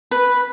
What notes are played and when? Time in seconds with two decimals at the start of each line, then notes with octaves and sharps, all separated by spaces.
0.11 B4